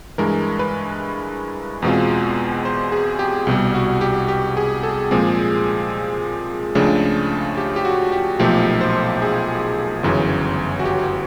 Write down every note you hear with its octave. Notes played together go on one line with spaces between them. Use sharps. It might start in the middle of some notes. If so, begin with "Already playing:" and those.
G2 E3 G#3 A#4
B4
E2 B2 G#3 C4 F4
C5
G#4
G4
C2 B2 G3 G4
F#4
G4
G4
G#4
A4
A#2 F3 G#3 C4 G#4
C#2 C#3 F3 A3 D4
G4
G4
F#4
G4
B1 A#2 F3 A3 G4
C5
G#4
G1 F#2 C#3 E3
F#4
G4